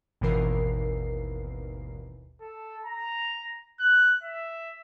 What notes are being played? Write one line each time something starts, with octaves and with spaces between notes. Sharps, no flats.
G#1 D#2 B2 E3 A#4 C7
A4
A#5
F#6
E5